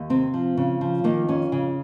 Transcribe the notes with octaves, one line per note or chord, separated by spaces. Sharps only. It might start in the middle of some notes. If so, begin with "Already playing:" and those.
Already playing: D#2
C3 C4
F3
C#3
F3
D#3 A#3
F2 C#4
C#3